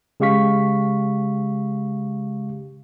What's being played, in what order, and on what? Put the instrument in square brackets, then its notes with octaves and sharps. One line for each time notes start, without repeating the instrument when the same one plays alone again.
[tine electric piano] C#3 G#3 G4 F5 C#6 B6